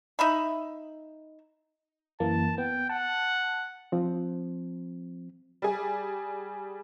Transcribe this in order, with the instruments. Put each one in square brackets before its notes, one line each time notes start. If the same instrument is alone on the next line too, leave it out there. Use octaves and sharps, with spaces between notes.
[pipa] D#4 E5 B5
[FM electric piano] F#2 E3 A#3 [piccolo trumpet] A5
[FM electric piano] B3 [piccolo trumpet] G5
[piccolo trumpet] F#5 [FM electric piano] A5
[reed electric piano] F3 C4
[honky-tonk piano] G3 G#4